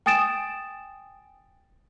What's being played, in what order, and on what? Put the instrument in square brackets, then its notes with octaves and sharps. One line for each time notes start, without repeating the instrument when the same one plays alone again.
[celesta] G5 G#5 D#6 A6 D7 E7